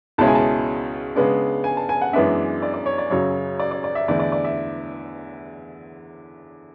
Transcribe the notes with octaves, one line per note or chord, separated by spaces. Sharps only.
C#2 B2 G#3 C#4 E4 A5
G#5
A5
C#3 G#3 B3 D4
G#5
A5
G#5
F#5
F#2 E3 G#3 B3 D4 E5
D5
D5
C#5
D5
F#2 C#3 F#3 C#5
D5
D5
D5
E5
E2 D3 A3 E4 D5
D5
D5
E5